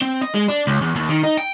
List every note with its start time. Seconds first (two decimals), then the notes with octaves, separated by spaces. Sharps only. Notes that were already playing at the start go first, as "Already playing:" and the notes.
0.01 C4
0.21 D#5
0.34 G#3
0.48 D4
0.67 C#2
0.82 E2
0.96 D#2
1.10 D#3
1.24 D#4
1.37 G5